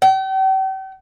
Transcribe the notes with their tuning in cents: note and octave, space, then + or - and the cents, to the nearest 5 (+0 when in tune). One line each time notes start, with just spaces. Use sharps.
G5 -40